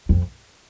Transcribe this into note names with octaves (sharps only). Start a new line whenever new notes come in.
F2